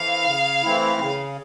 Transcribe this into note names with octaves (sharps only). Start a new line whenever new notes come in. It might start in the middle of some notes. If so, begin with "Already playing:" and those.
Already playing: E3 A3 C4 E4 F5
C#3
E3 A3 C4 E4
C#3